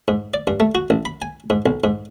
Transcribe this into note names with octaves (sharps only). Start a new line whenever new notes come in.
G#2
D5
G2
A3
F#4
A1
B5
G#5
G#2
B1
G#2